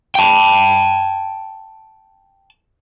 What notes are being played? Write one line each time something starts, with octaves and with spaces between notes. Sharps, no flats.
G5 A5